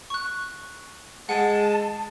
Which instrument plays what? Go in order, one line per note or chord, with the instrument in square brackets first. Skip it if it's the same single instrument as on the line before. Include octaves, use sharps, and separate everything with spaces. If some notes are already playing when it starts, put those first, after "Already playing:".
[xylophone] C#6 F#6
[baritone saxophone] G#3 [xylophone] F#5 [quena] A5